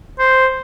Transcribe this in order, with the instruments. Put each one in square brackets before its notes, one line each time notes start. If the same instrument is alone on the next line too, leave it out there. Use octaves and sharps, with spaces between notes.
[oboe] C5